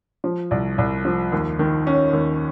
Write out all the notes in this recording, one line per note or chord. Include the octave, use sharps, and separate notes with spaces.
F3
C2
C2
F3
D#2
D#3
C#4
D#2